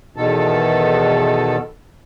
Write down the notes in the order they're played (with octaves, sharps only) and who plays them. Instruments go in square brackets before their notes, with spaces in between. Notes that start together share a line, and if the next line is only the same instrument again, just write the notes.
[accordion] E2 B2 D#3 A4